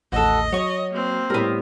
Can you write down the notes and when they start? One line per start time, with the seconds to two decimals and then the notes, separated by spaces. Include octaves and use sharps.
0.12 A1 D#2 F#4 A4 D#5
0.52 F#3 C#5 C#6
0.92 A#3 C4
1.30 A2 G3 B3 A#4